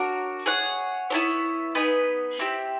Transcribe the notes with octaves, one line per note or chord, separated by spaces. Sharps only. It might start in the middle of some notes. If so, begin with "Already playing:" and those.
Already playing: D4 F#4 A#4 C#5
G#4 C#5 F#5
B3 E4 A4 C#5
B3 D#4 G#4 B4
C4 E4 G4